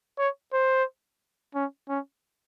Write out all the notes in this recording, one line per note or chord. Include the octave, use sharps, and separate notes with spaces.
C#5
C5
C#4
C#4